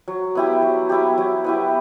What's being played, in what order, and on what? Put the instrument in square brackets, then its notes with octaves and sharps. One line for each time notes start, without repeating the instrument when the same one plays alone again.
[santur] F#3
B3 E4 G4
F#3
B3 E4 G4
F#3
B3 E4 G4